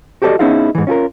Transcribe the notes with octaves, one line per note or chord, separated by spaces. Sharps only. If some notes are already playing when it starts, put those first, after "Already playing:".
F#4 G4 A4 B4 D5 D#5
B3 C#4 D#4 E4 G#4 F5
G#2 E3
C#4 F4 G#4 A#4